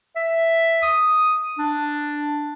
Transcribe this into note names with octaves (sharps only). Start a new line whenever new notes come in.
E5
D#6
D4